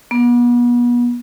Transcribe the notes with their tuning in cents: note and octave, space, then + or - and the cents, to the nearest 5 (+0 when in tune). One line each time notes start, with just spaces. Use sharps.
B3 -35